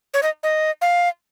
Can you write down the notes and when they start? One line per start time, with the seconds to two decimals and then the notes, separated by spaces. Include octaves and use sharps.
0.14 C#5
0.23 D#5
0.43 D#5
0.81 F5